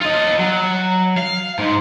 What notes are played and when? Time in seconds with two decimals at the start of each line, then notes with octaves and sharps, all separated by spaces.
0.01 F4 D#5
0.39 F#3
1.18 F5
1.59 G#2